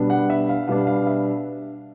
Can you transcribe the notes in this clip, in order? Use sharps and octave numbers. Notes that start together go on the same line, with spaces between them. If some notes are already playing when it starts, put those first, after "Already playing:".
Already playing: B2 G3 B3 D4
F#5
E5
F5
B2 G3 B3 D4 F5
F5
E5